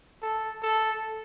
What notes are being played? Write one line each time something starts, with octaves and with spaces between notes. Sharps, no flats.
A4
A4